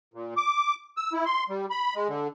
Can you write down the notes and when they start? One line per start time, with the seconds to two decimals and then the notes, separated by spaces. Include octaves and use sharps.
0.14 A#2
0.37 D6
0.97 E6
1.13 E4
1.26 C6
1.49 G3
1.70 B5
1.95 G#3
2.08 D3